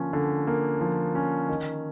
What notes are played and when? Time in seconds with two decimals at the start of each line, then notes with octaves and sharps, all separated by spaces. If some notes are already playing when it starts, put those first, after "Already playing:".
Already playing: D3 F3 A#3 C#4
0.13 D3
0.47 A#3
0.81 F3
1.15 C#4
1.49 D#3